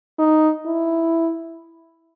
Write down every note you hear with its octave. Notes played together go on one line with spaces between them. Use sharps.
D#4
E4